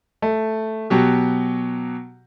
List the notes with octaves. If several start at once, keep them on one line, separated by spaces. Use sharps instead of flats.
A3
B2 F#3 G4